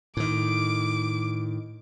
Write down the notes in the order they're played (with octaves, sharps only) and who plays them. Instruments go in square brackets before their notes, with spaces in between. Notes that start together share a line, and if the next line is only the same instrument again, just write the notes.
[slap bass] A2 D#3 [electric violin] D6